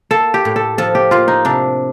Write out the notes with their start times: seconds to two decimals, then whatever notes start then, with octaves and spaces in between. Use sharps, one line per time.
0.11 A#3 A4
0.34 G4
0.45 A2
0.56 A4
0.78 F3 A4
0.95 G4
1.11 A#3 F4
1.28 D#4
1.45 C3 D4